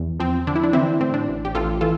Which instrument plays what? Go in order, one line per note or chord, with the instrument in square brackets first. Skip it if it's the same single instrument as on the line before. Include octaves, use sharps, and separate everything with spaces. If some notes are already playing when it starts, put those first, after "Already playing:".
Already playing: [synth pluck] E2
F3 C4
D3 D4
E4
D4
E3 C4 E4
A2 C4
D4
A1
G4
A1 F4 A4
E3 F4 A4